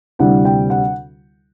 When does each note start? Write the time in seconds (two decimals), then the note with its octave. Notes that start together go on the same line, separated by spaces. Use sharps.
0.19 D2 C3 G3 C4 E4 F#5
0.45 G5
0.70 F#5